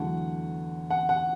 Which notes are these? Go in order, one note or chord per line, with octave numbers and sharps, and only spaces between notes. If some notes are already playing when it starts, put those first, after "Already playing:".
Already playing: E2 D3 F#3 A3 F#5
F#5
F#5